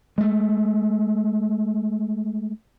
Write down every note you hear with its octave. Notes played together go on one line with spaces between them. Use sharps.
G#3 A3